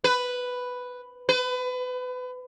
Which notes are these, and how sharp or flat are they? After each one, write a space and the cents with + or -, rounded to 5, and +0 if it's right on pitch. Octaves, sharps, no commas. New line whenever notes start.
B4 +5
B4 +30